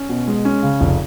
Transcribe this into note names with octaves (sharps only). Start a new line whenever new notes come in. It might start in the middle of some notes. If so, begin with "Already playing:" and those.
Already playing: C#4
B2
G#3
C#4
C#3
F1